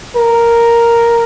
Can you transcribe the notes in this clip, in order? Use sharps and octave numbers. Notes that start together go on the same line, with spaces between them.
A#4